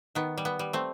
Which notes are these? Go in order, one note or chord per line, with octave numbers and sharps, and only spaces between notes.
D#3 B3
G3
B3
G3
A3 C4